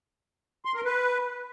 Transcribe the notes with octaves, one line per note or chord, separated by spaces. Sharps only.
C6
A#4
B4